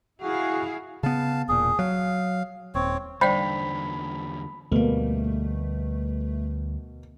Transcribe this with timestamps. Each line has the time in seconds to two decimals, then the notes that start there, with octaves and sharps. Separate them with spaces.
0.22 E4 F#4 G#4 F5
1.03 C#3 B3 F5 A5
1.49 E1 A#2 G#4
1.79 F#3 F5
2.75 D#1 C4 C#5
3.21 E2 D3 G3 C5 D5 G5 B5
4.72 D2 B2 G3 A3 A#3